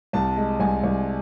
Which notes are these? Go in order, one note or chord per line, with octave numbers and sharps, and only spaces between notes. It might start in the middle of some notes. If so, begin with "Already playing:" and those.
C2 A5
G#3
C2 G#5
C2